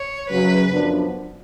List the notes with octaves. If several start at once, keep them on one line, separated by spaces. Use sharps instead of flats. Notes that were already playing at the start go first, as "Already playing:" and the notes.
Already playing: C#5
F#2 C#3 F#3 B4
F#2 F3 B3 D4